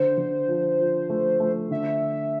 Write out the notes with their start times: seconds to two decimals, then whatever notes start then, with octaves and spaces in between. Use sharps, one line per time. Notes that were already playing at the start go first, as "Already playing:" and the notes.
Already playing: D3 C5
0.17 D3
0.48 F3
0.79 F3
1.10 A3
1.40 A3
1.71 D3 E5